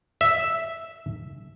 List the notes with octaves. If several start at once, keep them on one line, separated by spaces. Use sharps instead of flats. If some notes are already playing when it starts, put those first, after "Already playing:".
E5